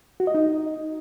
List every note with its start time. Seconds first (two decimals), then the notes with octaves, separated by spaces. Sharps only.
0.20 F#4
0.27 D#5
0.35 D#4